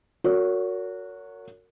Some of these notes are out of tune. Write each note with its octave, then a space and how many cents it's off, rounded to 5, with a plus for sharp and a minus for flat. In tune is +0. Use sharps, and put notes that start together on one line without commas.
F#4 -15 A#4 -30 C#5 +25